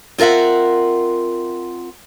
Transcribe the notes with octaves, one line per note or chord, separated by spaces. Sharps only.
C4 F4 A#4 E5 F#5